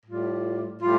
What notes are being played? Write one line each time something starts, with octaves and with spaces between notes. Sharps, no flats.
A2 G3 F4
A2 G3 F4